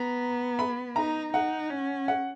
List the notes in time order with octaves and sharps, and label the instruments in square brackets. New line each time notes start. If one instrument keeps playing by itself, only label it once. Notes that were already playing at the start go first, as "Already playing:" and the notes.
Already playing: [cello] B3 [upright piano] A#5
[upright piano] B5
[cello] D#4 [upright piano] A#5
[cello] D#4 [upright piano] F#5
[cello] C#4
[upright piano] F#5